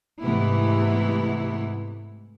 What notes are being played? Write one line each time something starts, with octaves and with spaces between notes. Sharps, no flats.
G#2 C3 E3 A3 B3 E4